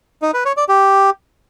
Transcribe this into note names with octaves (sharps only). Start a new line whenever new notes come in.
D#4
B4
C#5
D5
G4